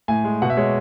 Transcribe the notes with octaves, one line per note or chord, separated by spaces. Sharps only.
A2 G#5
G#3
B2 F#5
E5
G#3 C#5